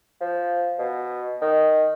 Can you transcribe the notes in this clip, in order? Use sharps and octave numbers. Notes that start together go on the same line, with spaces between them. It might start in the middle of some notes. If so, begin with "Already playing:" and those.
F3
B2
D#3